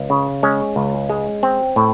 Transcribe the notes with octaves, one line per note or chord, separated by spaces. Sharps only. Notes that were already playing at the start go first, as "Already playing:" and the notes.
Already playing: C#2
C#3
G#3 C#4
C#2
G#3
C4
A2